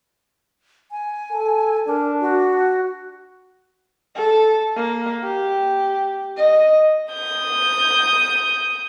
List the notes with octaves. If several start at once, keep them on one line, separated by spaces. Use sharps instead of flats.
G#5
A4
D4 A#4
F#4
A4
A#3
G4
D#5
D#6 G6